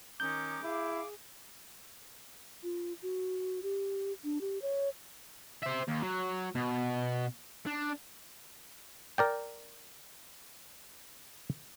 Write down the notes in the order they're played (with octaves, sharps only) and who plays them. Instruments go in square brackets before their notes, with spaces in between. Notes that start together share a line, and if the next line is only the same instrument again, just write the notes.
[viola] D#3 D6 [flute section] C#4 A#5 D#6 [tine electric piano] G6
[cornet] E4 [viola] G#4 [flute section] F5 D6
[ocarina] F4
F#4
G4
D4
G4
C#5
[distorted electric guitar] C5 E5
D#2
F#3
B2
D4
[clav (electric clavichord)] A#4 D5 G5